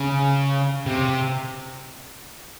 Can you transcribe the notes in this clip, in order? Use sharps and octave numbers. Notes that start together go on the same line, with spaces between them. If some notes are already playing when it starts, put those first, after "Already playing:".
Already playing: C#3
C3